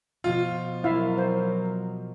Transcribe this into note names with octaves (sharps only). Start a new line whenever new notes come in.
B2 F3 F4
F#3 E4 A#4 E5 F5
C5